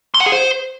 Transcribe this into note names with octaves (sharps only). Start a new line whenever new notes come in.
C6
F#5
G#4
C5